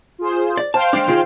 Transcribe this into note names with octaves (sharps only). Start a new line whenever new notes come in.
F4 G#4 C5
D5
C5 F5 G5 A5
G#3 D4
D#3 F4 G#4